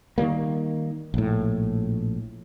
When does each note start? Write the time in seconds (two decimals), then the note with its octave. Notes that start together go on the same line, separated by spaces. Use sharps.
0.18 D#3 F#3 G3 A#3
1.14 A#1 A2